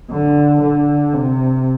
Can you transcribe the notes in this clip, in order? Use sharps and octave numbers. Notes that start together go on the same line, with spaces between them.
D3
D3
C3